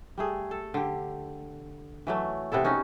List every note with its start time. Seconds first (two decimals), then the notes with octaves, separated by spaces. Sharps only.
0.18 G3 A3 G#4
0.51 A4
0.74 D3 G4
2.07 E3 F#3 A3
2.52 C3 B3 E4 A4
2.65 C#4 D#4 F#4 G#4